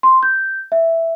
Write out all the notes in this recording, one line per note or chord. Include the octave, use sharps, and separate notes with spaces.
C6
G6
E5